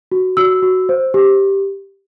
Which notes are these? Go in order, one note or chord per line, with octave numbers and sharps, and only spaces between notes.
F#4
F#4 E6
F#4
C5
G4